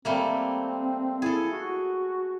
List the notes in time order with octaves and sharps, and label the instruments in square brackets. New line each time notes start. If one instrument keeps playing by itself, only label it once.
[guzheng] G3 A3 A#3 [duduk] C4
[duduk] E4 [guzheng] G#4 A4
[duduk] F#4